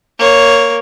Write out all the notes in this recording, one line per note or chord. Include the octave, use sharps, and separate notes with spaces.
A#3 C#5